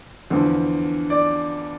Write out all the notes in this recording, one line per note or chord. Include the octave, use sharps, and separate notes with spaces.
E2 D3 F3
D5